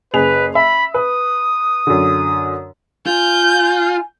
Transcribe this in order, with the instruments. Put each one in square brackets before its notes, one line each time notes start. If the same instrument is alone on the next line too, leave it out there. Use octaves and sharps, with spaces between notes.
[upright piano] F#1 G#4 F7 [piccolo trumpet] B4
[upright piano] E5 [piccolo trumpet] B5
[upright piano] B4 [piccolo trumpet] D#6
[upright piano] F#2 D3
[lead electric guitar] F4 [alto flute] G#5 [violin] G6